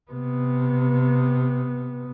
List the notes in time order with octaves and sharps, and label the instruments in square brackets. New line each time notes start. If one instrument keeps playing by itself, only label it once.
[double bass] C3 B3